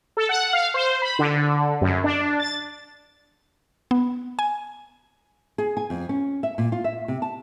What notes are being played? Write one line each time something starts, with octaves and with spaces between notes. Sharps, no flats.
A4
F#5
F5
C5
B5
D3
F#2
D4
A6
B3
G#5
G#4
G#5
F2
C#4
E5
A#2
F4
E5
C3
A5